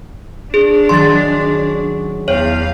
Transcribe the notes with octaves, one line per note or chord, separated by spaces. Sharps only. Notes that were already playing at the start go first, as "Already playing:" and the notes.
D4 G#4
D#3 F#3 G#4 C6 A6
C#4
E2 C#5 F5 G5